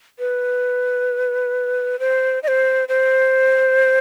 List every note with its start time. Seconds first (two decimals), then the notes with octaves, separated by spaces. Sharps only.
0.19 B4
1.99 C5
2.43 D#5
2.48 C5
2.89 C5